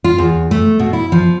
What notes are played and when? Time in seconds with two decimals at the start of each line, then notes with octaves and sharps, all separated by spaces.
0.04 F4
0.18 E2
0.51 A3
0.79 B2
0.93 E4
1.12 F3